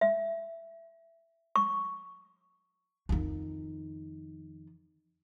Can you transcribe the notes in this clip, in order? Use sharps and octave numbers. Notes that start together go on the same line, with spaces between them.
E5
C#6
F2 D#3